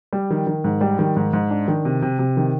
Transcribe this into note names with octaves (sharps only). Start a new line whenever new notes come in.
G3
D#3
D#3
G#2
G3
D#3
G#2
G#2
D4
D#3
C3
C3
C3
D#3